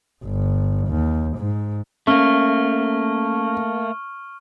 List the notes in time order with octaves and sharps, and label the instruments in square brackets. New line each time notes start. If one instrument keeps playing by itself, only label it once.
[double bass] G1
D#2
G#2
[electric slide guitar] A3 A#3 [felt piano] C#4 [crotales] C#6 F6